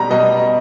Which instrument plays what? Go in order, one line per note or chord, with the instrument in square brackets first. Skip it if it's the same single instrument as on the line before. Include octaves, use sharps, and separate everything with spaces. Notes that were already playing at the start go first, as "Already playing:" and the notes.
Already playing: [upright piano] B2 G3 A#5
B2 G3 D#5